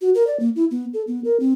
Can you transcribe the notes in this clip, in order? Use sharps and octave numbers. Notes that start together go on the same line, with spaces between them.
F#4
A#4
D5
A#3
E4
B3
A4
B3
A#4
C4